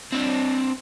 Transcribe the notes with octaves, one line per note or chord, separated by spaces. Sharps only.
C4 D4